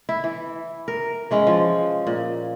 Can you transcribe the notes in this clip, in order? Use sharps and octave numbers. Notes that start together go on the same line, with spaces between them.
E4
E3
A#4
E3 G#3 C#4
F3
A#2